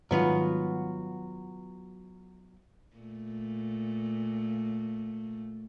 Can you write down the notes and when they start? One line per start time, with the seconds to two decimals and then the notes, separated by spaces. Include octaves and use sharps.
0.11 G#2 D#3 F#3 G3 B3 F4
2.96 A#2 A3